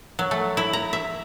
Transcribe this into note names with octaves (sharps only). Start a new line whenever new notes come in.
F#3
A3
E4
A#5
E5